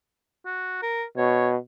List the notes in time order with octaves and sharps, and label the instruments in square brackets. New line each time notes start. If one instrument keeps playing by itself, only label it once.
[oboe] F#4
A#4
[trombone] B2 [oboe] C#5